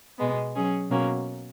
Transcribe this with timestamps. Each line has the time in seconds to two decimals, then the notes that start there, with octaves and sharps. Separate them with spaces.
0.18 B2 G#3 B3
0.55 F#3 C#4 G#4
0.90 B2 F#3 A#3 C#4